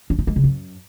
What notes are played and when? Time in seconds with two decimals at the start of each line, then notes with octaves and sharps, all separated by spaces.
0.10 C#4
0.19 D#4
0.27 G#3
0.36 C#3
0.44 F#2